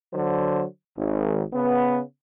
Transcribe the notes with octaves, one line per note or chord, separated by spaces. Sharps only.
D3 F#3 C5
G#1
C#3 B3